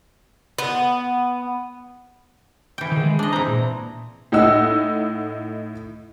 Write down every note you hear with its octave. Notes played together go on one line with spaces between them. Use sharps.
B3
E3 G5
D#3 G#4
G#3
D4 G#4 D#5
E3 C4 A#5
A#2
A2 D#4 D#5 F#5 E6